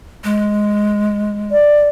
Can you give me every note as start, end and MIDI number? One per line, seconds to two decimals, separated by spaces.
0.24 1.53 56
1.51 1.89 74